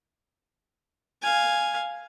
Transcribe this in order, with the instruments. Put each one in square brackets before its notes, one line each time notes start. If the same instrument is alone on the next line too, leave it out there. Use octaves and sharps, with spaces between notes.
[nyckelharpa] F5 G#5